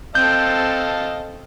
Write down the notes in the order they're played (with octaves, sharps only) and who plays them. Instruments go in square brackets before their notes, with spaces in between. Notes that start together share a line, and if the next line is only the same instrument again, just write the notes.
[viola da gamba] C4 A4 [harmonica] D#5 F5 A5 [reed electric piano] G6